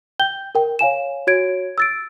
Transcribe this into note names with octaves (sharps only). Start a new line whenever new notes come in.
G5 G6 G7
A#4 G5
C#5 F5 G#5 E7
F#4 C#5 G#6 D7
E6 A6 D7